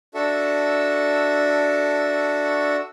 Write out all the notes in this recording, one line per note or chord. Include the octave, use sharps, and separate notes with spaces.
D4 F#4 A4 E5